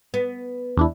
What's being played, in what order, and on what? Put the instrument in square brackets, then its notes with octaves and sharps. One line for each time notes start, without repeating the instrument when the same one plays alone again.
[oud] B3
[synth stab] E2 D4 E4